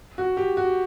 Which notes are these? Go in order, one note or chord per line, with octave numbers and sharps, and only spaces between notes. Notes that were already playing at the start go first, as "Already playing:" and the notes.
F#4
G4
F#4